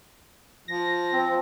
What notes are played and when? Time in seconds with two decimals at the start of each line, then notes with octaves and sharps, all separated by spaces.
0.68 F3 A#6
1.12 C4